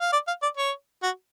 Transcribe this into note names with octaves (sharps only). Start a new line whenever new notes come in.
F5
D5
F5
D5
C#5
F#4